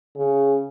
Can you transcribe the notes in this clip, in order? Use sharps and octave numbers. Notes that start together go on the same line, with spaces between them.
C#3